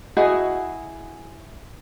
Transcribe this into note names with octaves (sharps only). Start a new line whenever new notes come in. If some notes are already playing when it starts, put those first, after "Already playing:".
E4 F#4 G#4 D#5